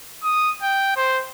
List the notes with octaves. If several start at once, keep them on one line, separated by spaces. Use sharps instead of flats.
D#6
G5
C5